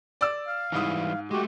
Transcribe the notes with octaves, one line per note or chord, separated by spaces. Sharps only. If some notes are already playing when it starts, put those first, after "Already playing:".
D5 E6
F5
G#2 E3 G3 E4 D#6
G#3 A3 F#4 G4